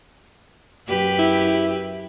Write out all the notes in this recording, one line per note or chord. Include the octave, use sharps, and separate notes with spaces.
F#2 G4 B4
E4